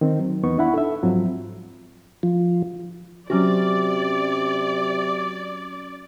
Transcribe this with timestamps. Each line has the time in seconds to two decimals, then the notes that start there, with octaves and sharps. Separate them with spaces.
0.01 D#3 C4
0.19 F#3
0.43 E2 E3 B3 D#4 C#6
0.58 D4 E4 E5 F#5 B5
0.74 A4 E5
1.03 G#2 F3 F#3 C4 F4
2.23 F3
3.30 C3 F#3 C#4 F#4 D5